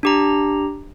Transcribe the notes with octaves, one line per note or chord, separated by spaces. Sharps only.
D4 G4 A#5